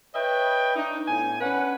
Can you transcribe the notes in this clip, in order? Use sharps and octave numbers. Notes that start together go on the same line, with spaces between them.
B4 C#5 D#5 E5 G5
D4 D#4
A2 B3 G#5
C#4 D4 B4 F#5